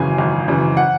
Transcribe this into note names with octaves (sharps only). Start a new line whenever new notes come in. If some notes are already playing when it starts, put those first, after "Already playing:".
Already playing: G#1 F#2 C#3 E3 G#5
G#1
F#2 C#3 E3
F#5